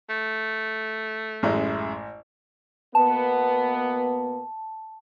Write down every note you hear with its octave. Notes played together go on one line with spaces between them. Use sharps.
A3
A1 F#2 G#3 E4
B2 A#3 B3 A5